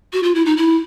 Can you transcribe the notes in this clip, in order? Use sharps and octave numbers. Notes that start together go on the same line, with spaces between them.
F#4
F4
E4
D#4
E4